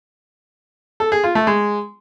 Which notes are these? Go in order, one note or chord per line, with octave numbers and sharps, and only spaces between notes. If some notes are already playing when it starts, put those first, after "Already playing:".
A4
G#4
F4
A3
G#3